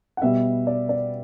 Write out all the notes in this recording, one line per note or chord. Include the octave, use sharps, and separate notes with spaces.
F#5
B2 G3 B3 E5
D5
D5